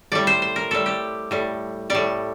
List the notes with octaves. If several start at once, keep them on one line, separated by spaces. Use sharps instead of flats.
A2 G3 D5
C5
C5
A#4
A2 G3 A4
G4
A2 G3
A2 G3 D5